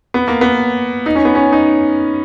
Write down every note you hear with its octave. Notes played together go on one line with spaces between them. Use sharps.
B3
A#3
B3
D#4
C#4
B3
C#4
D#4